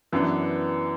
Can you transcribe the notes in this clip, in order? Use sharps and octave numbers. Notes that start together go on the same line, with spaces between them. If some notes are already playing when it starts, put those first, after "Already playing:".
F#2 E3 B3 D4